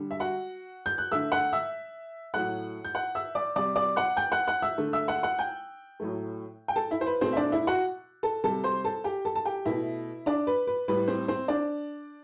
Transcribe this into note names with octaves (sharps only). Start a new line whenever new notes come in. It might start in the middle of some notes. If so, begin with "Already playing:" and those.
Already playing: D3 G3
E5
F#4 F#5
G6
F#6
D3 A3 E5 E6
F#5 F#6
E5 E6
A2 F#3 A3 F#5 F#6
G6
F#5 F#6
E5 E6
D5 D6
C3 G3 D5 D6
D5 D6
F#5 F#6
G5 G6
F#5 F#6
F#5 F#6
E5 E6
D3 A3
E5 E6
F#5 F#6
F#5 F#6
G5 G6
A2 F#3 A3
G5
A4 A5
E4 E5
C5
B4
B2 A3 C4 C5
E5
D4 D5
E4 E5
F#4 F#5
A4 A5
C3 G3 A4 A5
C5 C6
A4 A5
G4 G5
A4 A5
A5
G4 G5
B2 A3 E4 E5
D4 D5
B4
B4
A2 G3 B4
C4 C5
C4 C5
D4 D5